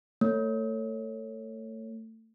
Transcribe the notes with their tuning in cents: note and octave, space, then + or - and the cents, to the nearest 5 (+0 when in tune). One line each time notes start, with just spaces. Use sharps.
A3 +25 C#5 +0